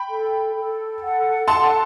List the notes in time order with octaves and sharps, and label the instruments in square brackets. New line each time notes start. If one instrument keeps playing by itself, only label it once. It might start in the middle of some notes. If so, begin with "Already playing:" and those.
Already playing: [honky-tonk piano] G5 B5
[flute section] A4
A4
F#5
[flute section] A4 [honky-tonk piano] A5 C6